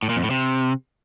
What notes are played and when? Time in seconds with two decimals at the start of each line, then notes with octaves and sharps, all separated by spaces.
0.03 A2
0.09 A#2
0.16 F2
0.23 A2
0.30 C3